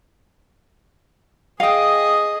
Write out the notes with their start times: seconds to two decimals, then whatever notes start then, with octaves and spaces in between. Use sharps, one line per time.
1.60 G#4 D#5 F5 G5